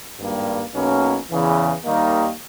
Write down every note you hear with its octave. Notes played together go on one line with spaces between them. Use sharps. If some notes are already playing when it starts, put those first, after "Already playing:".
G#1 G2 G3 A#3
B1 B2 A#3 C#4
E2 C#3 E3
D#2 D#3 G3 A#3 D#4